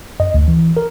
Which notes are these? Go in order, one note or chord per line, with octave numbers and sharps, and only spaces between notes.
F#2 D#5
D2
E3
A#4